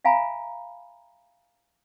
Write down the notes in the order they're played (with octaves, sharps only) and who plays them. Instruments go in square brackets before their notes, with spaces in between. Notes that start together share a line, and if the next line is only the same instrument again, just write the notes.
[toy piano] E5 F5 G#5 A#5 B5